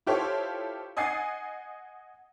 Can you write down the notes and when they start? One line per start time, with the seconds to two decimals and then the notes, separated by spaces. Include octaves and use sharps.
0.07 E4 F4 G4 A4 C5 C#5
0.97 D#5 F#5 G#5 D#6 A6 C7